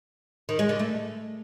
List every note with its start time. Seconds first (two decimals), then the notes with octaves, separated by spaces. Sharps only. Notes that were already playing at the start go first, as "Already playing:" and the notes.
0.49 D#3
0.59 G#3
0.69 D3
0.79 A3